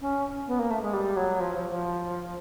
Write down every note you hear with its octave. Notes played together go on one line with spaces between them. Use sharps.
C#4
B3
A#3
A3
G#3
G3
F#3
F3
F3
F3